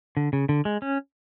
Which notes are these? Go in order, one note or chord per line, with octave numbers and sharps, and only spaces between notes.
D3
C#3
D3
G#3
C#4